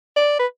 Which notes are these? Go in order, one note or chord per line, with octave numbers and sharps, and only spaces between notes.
D5
B4